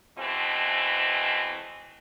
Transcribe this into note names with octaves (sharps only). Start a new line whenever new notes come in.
B2 E3 G#3 A3 C4